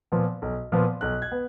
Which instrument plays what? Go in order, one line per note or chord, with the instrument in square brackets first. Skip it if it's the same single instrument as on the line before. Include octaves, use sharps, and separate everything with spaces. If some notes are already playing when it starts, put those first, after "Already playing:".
[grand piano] A#2 F3 B3
B1
A#2 F3 B3
B1 F#6
G#6
B3